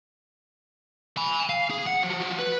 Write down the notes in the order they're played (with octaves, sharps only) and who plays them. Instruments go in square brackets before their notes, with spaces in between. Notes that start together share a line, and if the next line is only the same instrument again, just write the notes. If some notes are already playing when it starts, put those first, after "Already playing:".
[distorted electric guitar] G#5 B5
F5
G#4
F#5
F3 F#3
B4